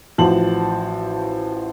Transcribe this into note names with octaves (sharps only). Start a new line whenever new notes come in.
A1 F3 F#4 C5 A5 F#7